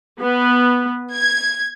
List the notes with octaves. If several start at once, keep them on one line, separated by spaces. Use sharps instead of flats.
B3
G#6